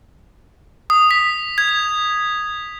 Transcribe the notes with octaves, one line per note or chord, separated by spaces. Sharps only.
D#6
B6
G#6